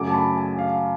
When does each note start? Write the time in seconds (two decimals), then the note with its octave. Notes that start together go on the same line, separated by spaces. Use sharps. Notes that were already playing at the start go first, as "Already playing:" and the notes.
Already playing: F#2 C#3 F#3 A3 D6
0.10 A5
0.14 B5
0.37 G#5
0.58 F5